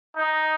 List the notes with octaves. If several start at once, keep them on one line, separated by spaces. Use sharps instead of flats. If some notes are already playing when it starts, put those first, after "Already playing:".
D#4